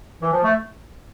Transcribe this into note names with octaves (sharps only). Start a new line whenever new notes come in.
E3
F3
A3